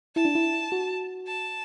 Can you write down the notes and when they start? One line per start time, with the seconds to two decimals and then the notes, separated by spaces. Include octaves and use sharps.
0.16 E4 A5
0.25 D4
0.35 E4
0.72 F#4
1.27 A5